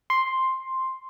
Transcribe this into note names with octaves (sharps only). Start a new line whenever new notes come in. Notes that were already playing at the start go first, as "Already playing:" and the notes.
C6